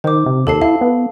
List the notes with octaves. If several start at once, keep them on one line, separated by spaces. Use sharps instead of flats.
D#3 C5 D6
C3
D#2 A4 A5 C7
E4 F5 A5
B3